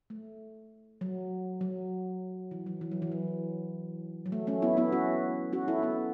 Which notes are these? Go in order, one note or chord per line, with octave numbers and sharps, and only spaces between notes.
A3
F#3
F#3
E3
F#3
E3
F#3
E3
F#3
F#3
A3
A3 C#4
B3 E4
B3 E4
C#4 F#4
C#4 F#4
E4 A4
B3 E4